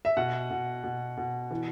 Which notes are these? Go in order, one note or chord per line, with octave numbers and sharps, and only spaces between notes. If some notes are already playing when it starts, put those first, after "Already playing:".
E5
B2 F#5
B2
B2
B2
E3